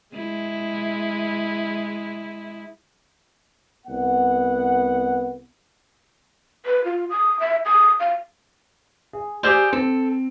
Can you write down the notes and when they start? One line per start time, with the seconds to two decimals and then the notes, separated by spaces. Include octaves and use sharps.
0.15 G#3 E4
3.86 C2 B3 F#5
6.66 B4
6.84 F4
7.10 D#6
7.40 E5
7.65 D#6
8.00 F5
9.13 G#4
9.43 G4 G#4 C5 D5 E6 G6
9.73 C4 A4